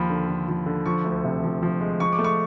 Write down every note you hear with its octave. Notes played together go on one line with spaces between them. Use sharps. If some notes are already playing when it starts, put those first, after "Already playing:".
Already playing: D#2 F3 B5
D3
D3
F3
D3
F3 C#6
D2
C3
F3
F3
G#3
F3 C#6
D6
A3
C#6